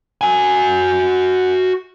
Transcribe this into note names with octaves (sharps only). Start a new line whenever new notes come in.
F#4 G#5